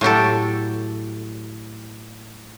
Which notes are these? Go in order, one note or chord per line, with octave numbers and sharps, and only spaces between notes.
A2 F#3 G4 A4